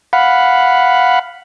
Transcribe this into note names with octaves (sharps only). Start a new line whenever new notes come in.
F5 F#5 B5